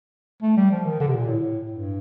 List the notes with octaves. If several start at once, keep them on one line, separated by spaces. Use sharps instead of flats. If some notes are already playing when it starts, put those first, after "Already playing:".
A3
G3
F3
D#3
D3
C3
A#2
A2
G2